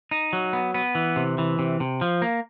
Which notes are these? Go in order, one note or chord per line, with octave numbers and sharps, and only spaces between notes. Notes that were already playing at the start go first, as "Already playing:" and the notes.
D#4
F#3
B3
B3
E3
C3
E3
C3
C3
F3
A#3